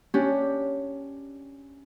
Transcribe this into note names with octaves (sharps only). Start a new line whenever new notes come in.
C#4 D4 G4